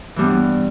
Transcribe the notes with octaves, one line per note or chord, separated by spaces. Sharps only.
G2 E3 G3 B3